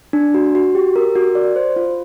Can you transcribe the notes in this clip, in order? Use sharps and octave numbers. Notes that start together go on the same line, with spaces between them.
D4
F#4
F#4
G4
A#4
F#4
D5
C5
F4